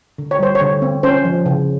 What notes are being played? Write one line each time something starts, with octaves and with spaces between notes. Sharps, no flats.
D3
C#5
G3 C5
C#5
D3
C4
C#4 C5
F3
C#3